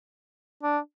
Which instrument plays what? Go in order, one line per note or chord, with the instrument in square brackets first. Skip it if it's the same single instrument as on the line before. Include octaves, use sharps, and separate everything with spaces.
[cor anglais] D4